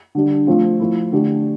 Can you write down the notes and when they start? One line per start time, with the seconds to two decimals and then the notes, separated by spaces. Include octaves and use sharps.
0.15 D3 G3 D4
0.47 F3 A3 C4 F4
0.80 F3 A3 E4
1.12 D3 A3 D4 G4